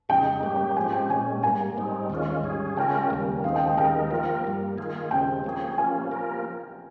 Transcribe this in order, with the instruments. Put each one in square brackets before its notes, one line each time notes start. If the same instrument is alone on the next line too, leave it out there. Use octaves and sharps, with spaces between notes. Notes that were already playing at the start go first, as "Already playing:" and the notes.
[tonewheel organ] F2 C#3 G#3 D#4 [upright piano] G5
[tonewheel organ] G#2 G3 A#3 C#4 G4
[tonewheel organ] G#2 F3 G#3 C4 G4 [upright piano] G#5
[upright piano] G5
[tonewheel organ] A#2 G#3 C#4 [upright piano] G#5
[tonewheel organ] G#2 G3 A#3 [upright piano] G#5
[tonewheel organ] G#2 G3 C4 D#4
D#2 D#3 G#3 C#4 F4
G#2 G3 C#4 G#4
[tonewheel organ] C#3 G#3 C#4 F4 A#4 [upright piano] G5
[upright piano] G#5
G5
[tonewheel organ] D#2 C#3 G3 A#3
[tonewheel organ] D#2 D#3 G#3 C4 D#4 [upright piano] F5
[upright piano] G5
G5
[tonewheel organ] D#2 D#3 G#3 D#4 A#4 [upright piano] G5
[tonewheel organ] F3 A#3 F4 A#4
G2 G3 A#3
D#3 A#3 F4 G#4
[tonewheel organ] D#2 C#3 G#3 C4 [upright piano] G5
[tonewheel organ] F3 A#3 C#4 G#4
[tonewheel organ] F3 A#3 C#4 F4 [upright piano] G#5
[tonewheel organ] F3 A#3 F4 A#4